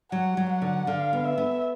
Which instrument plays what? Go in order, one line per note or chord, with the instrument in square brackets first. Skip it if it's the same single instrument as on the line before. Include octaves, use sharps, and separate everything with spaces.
[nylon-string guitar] F#3 [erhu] F#5
[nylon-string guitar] F#3
[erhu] F#5
[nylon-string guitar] D3
[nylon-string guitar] D3 [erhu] F5
[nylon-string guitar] B3
[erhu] E5
[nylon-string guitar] B3